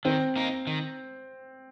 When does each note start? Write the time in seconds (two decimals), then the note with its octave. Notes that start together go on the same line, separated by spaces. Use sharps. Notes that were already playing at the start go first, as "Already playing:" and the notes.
0.05 D#3 C4
0.36 A#3 D#4
0.67 D#3